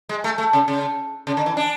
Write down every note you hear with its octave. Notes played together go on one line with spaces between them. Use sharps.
G#3
A3
A3
C#3
C#3
C#3
D3
E3
D4